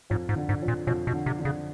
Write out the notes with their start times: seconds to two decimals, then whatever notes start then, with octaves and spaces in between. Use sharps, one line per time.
0.10 F2 G#2
0.29 G#2
0.36 D3
0.49 G#2
0.62 F2
0.68 A#2
0.87 F2 B2
1.07 B2
1.13 D3
1.26 C3
1.39 D3
1.45 C#3